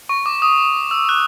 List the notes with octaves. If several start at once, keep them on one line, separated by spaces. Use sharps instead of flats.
C#6
D6
D#6
E6
F#6